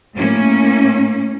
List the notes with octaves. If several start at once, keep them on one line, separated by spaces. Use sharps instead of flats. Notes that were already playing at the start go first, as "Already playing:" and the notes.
A2 A#3 C#4